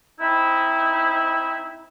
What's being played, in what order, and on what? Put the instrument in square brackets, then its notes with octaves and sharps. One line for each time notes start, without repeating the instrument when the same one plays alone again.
[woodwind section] C4 D#4 E4